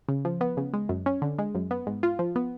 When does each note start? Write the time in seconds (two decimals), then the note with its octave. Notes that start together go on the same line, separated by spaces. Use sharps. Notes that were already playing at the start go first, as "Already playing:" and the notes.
0.09 C#3
0.25 F3
0.41 B3
0.57 C#3
0.73 G#3
0.89 F#2
1.06 C#4
1.22 D3
1.39 G#3
1.55 F#2
1.71 B3
1.87 G#2
2.03 F4
2.19 F3
2.36 B3